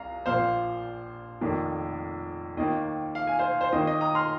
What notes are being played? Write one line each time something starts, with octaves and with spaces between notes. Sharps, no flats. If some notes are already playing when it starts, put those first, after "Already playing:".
Already playing: C2 F5 A#5
A#1 A#2 F3 A#3 C5 F5
F1 F2 D#3 A#3
D#2 D#3 A#3 D#5
F5
G#5
C5 F5
C5
D#2 D#3 A#3 D#5
D#5
A#5 D#6
C6 F6